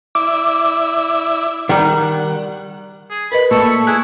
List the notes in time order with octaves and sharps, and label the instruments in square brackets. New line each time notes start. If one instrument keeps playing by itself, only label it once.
[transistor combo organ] E4 D5 E5 [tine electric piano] D6
[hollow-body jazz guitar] D#3 G3 [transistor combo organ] F#5
[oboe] G#4
[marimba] A#4 B4 D#5 [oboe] B5
[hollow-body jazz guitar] A#2 A3 [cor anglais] A4 [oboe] C#6
[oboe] E4 [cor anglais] G#4 [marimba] F#6